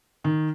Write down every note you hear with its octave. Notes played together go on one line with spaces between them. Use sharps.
D#3